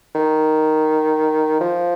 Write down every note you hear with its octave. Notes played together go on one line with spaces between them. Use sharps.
D#3
F3